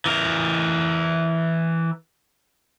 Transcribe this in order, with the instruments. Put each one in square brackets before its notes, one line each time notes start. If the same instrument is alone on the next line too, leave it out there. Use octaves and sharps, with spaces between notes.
[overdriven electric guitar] E3 A#4